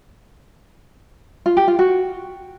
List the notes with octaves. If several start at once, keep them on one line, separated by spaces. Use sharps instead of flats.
F4
G4
F4
F#4